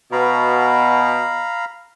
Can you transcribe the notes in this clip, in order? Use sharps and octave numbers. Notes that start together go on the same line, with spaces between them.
B2 F5 A#5 B5